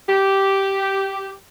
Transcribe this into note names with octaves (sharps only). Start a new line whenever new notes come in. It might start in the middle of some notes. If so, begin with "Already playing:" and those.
G4